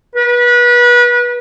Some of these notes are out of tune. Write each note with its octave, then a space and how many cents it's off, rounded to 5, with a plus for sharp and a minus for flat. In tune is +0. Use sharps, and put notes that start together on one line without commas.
B4 -30